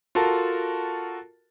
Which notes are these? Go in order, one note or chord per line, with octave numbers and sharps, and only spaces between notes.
F4 F#4 A4 A#4 A5